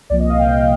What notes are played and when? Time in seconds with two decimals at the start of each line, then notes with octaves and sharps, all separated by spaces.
0.10 C2 A#2 F3 D5
0.20 D#5
0.30 F5
0.39 G5